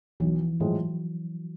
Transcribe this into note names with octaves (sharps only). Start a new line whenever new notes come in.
B1 E3
F3
A2 F3 F#3 G#3